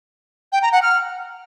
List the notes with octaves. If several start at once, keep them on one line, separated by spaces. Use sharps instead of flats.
G5
A#5
F#5
F6